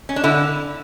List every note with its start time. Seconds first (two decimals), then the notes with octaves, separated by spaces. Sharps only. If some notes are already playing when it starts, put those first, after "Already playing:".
0.09 C#4
0.16 D4
0.24 D3 E4